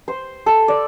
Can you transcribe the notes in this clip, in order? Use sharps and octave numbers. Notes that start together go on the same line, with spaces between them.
C5
A4
D5